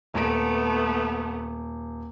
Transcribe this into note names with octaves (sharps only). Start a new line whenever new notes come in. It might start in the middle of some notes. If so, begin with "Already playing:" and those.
D#1 A3 B3 D7